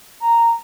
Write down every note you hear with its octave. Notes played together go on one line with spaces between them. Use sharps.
A#5